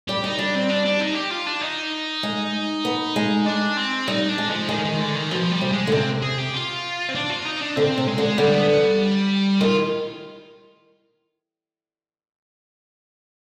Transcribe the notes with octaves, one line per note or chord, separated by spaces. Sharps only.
G3 G4
G3 D#4
G3 D4
C4
D4
D4
D#4
G4
F4
D4
D#4
G#3
B3
G#3
D4
C4
G3 D#4
D4
G#3
F3
D#3 G#3
D#3
D3
D#3
B2 F3
G3
C3
G#3
D3
C3 C4
G#4
G4
F4
C4
D4
F4
D#4
D4
D3 C4
C3
G#3
D3
D3 G3
B3
B3
G3
D#3 F4